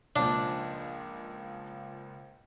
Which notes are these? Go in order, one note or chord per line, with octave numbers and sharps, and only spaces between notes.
C#2 A#2 F3 D4